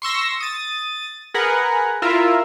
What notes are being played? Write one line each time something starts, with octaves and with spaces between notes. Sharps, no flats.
C6 C#6 E6 A#6
D#6 A6
G#4 A#4 B4 F#5
E4 F4 A#4 E5